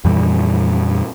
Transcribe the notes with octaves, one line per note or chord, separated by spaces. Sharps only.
F2 A#2 E3 G3